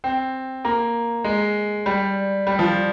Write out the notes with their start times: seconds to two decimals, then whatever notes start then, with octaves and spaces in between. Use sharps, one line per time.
0.04 C4
0.65 A#3
1.24 G#3
1.86 G3
2.47 G3
2.59 F3